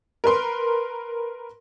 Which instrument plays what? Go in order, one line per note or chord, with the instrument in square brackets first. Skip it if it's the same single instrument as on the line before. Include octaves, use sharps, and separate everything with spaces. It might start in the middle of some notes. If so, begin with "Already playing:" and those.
[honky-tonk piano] A#4 B4 C6